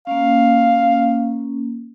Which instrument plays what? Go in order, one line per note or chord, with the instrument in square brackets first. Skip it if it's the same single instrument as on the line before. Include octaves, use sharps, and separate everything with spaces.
[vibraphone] A#3 C#4 [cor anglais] F5